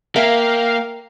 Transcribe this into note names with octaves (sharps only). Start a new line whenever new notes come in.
A#3 A#4 E5 F5 G5 A#5